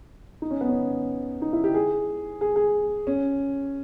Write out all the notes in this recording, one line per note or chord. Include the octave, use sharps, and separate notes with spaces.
D#4
C#4
B3
C#4
D#4
E4
G4
G#4
G#4
G#4
C#4